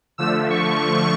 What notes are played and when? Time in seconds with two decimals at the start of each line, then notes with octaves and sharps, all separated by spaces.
0.18 D3 F3 A3 E6
0.50 C#6